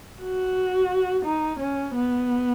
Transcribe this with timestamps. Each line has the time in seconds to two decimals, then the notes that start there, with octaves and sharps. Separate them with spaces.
0.22 F#4
1.25 D#4
1.59 C#4
1.95 B3